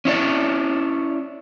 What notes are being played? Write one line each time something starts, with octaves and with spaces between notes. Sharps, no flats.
C#4 E4 C#5 D5